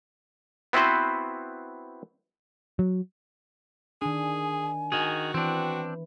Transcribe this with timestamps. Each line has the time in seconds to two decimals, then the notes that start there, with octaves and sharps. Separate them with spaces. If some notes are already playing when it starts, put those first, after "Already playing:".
0.73 B3 C4 E4 F#4 B4 C5
2.79 F#3
4.02 D#3 D4 G#4 G#5
4.92 D#3 F#4 G#4
5.34 E3 C4 D4 G5